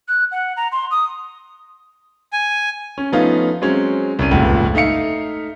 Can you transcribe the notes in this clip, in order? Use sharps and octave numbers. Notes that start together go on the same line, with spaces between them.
F#6
F#5
A#5
C6
D#6
G#5
C#4
F3 A3 B3 C#4 D#4 F4
F#3 G#3 C4 C#4
C2 C#4 D#7
F1 C#2 G2 A#2
A3 D#4 E5 F5 C#7